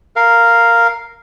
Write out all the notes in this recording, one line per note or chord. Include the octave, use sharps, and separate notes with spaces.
A#4 F5